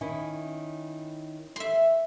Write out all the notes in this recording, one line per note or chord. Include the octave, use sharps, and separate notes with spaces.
D#3 C#4 E4
E5 C6